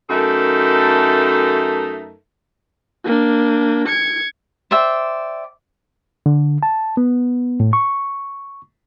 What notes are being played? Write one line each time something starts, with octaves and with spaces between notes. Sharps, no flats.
F#2 A3 D#4 A4 A#4 E5
A#3 D4
G#6 C#7
C5 D5 E5 G5
D3
A5
B3
A2
C#6